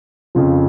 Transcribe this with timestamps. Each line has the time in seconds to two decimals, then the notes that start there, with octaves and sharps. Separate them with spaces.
0.35 F2 C#3 F3